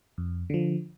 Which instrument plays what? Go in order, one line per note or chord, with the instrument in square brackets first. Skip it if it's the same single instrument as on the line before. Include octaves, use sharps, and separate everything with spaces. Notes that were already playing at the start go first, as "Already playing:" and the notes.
[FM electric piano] F2
D3 F3